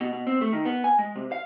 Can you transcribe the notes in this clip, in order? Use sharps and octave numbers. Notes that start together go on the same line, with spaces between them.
B2
B2
C4
A3
D#3
B3
G#5
G#3
C3
F5